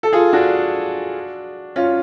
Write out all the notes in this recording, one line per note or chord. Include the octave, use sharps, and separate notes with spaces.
A4
F4 G#4
D4 F#4
C#4 F4